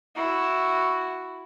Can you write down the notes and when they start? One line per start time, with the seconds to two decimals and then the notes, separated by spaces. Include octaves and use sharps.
0.16 E4 F#4